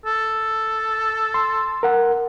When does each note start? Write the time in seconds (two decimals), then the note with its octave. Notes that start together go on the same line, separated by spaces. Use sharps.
0.06 A4
1.34 C6
1.83 A#4 F#5